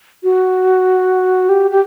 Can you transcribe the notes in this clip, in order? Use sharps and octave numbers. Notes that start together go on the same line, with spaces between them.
F#4
G4
G4